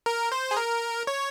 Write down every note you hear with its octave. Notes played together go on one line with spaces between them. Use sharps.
A#4
C5
G#4
A#4
C#5